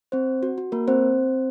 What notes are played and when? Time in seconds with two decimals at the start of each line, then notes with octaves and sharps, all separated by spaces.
0.12 C4 C5
0.43 F#4
0.58 F#4
0.72 A#3 A#4
0.88 C4 C5